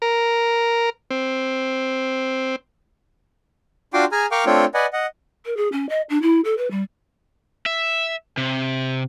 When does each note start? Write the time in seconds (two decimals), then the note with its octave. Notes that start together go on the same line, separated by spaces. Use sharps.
0.02 A#4
1.11 C4
3.94 D4 F4 F#4 G5 C6 D6
4.12 G#4 G#5 A#5 F6
4.31 A#4 F5 G5 C#6 D6 F6
4.46 A3 C4 D4 F4 C#5 G5
4.74 B4 D5 D#5 F#5 G#5
4.93 D#5 F#5
5.45 A#4
5.57 G#4
5.72 C#4
5.89 D#5
6.10 D4
6.22 E4
6.44 A4
6.58 B4
6.71 G3
7.66 E5
8.37 C3